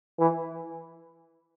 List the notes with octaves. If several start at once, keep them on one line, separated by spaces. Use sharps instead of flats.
E3